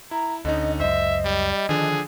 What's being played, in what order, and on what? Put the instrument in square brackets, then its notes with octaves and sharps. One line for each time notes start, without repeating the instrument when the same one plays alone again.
[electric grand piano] E4 [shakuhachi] A#5
[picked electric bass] D2 [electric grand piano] D3 C#4 D#4 [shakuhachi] D#5
[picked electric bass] C#2 F#2 [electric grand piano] C5 [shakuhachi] D#5 [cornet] E5
[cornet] G3
[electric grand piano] D3 F3 D4 [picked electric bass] D#3 [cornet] G#4